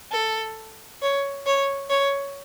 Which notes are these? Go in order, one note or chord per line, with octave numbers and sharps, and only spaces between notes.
A4
C#5
C#5
C#5